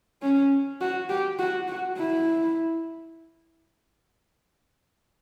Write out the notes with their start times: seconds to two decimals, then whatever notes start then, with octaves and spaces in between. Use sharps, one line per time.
0.22 C#4
0.81 F#4
1.09 G4
1.38 F#4
1.68 F#4
1.97 E4